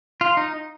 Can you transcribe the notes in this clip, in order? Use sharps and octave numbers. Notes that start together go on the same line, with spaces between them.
F4
D#4